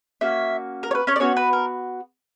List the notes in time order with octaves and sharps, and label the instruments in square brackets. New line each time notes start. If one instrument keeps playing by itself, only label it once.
[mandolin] A#3 C#4 F#4 E5
A#4
C#5
B4
C#4 C#5
D5
B3 C#4 F#4 C#5
B4
A#4